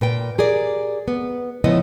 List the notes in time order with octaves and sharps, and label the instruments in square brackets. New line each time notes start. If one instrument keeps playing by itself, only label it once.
[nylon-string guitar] A#2 B4 G5
G4 G#4 A#4 D5
B3
C#3 F3 G#3 B3 E4 D#5